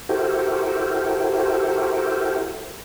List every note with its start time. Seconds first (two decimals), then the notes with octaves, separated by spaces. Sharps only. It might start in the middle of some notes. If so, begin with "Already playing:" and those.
0.09 E4 F#4 G4 A4 A#4 C5